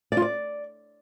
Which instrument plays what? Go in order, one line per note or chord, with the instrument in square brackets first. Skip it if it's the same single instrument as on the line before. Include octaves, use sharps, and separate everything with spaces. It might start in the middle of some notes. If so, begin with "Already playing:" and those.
[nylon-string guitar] D5
F4
D5